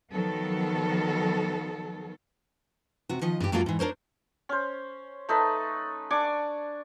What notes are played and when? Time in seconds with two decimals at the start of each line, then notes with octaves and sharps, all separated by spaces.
0.11 D#3 F3 F#3 B3 A4
3.09 C3 F#4
3.21 D#3 F3 D#5
3.40 G2 G4
3.52 F#2 F#3 A#3 F4 A4 D5
3.66 G#2 E3
3.79 D4 A#4 C5 C#5
4.49 C#4 C5
5.29 A3 D#4 A4 B4
6.10 D4 G#5 C#6 D6